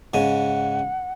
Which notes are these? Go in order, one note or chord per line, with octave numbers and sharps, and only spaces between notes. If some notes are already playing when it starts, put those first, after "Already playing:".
G#2 C#3 F#5 G#5